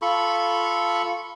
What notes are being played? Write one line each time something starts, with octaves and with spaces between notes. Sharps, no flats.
F4 A4 B5 C#6